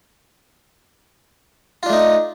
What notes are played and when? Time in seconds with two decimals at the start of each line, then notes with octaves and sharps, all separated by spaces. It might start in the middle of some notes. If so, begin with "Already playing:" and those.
1.83 F4
1.86 D4
1.89 A3
1.93 D#4